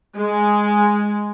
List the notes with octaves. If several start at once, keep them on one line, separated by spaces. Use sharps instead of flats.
G#3